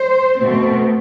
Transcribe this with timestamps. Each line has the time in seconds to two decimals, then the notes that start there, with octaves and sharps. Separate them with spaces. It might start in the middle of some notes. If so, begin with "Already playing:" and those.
Already playing: C5
0.38 B2 A3 C4